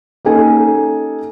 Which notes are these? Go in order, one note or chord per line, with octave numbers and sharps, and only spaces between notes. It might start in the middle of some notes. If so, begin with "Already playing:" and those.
A#3 C#4 D#4 G4 A4 G#5